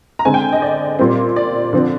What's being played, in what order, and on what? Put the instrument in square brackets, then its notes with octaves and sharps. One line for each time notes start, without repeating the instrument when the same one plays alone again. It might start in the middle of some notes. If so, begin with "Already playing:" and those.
[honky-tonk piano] A#5
D3 G#3 C4 G#5
G5
D#5
D5
A#2 G3 C4
D5
D3 F3 C4